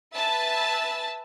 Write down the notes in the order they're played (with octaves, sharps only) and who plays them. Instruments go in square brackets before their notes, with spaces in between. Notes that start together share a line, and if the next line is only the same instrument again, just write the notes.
[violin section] B4 E5 G#5 A5 E6 A6